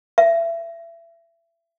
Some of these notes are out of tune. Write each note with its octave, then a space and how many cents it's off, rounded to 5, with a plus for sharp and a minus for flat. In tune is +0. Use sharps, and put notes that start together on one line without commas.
E5 +25